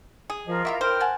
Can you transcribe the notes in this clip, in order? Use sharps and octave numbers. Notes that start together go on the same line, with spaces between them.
G#4
F3 F4 A#4 D#5
E4 F#4 E5 D6
A#4 C5 G5 F6
F#5 G#5 A5